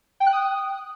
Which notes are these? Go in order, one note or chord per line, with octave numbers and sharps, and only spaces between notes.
G5
F#6
D#6